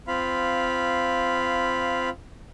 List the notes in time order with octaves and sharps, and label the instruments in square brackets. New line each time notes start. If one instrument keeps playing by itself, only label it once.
[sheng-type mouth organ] C4 F4 F5 B5